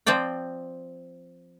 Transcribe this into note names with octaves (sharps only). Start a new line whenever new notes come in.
F3 C4 C5 D5 G5